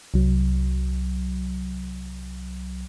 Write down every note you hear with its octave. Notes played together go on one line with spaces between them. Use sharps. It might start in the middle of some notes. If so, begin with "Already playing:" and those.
C2 F#3